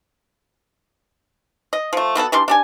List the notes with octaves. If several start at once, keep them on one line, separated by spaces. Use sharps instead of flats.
D#5
F3 A3
B2 B3 A4 F#5
E3 G3 D4 C6
D4 G4 G#5